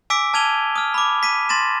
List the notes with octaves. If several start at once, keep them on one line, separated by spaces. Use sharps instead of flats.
G#5 D6 E6 B6 D7
A5 F6 G#6 D#7 F7 G7
D#6 F6
B5 D6
B6 D#7
C6 A6 A#6 E7